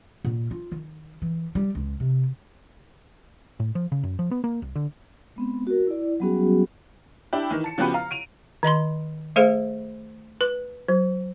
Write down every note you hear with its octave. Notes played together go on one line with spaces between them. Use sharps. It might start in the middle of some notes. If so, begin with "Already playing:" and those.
A#2
F4
D#3
E3
G3
C#2
C3
A2
F3
C#3
F#2
F3
B3
A#3
C2
D3
G#3 B3 C4
F#4 A#4
E4 D5
F#3 G3 B3 C#4 F#4 G#4
D4 E4 G4
D#3 E3
A5 C#7
C#3 F3 B3 F#4 G4 B4
F5 A#5
D7 D#7 F7
D#3 D#5 B5 C6
A3 G#4 A4 C5 F5
B4
F#3